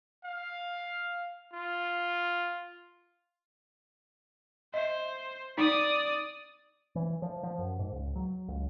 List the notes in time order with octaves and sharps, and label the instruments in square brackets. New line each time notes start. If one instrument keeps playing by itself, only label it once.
[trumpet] F5
F4
[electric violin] C5 [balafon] D#5 E5
[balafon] D#4 [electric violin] D5 D#6
[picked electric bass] E3
F3
F3
F#2
G#2
C#2
F#3
C#2